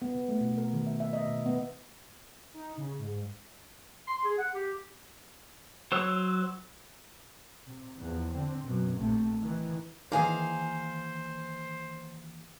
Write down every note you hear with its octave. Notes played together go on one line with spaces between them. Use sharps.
B3
C3
A3
B2
A#4
D#3
E5
E5
D#5
B2
B3
D#4
C#3
G#2
C6
G#4
F#5
G4
F#3 C5 C#5 E6
C3
E2 F3
D3 C4
F#2 B2
A#1 C3 A3
D#3 E3
D#3 E3 A#3 G#4 C5 F5 G#5 A#5